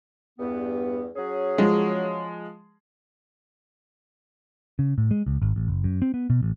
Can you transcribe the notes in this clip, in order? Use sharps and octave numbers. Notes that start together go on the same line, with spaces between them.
E2 G2 B3
F#3 C#4 G#4
F3 G#3
C#3
A2
G#3
C#2
G#1
A1
F#1
F#2
C4
B3
B2
A1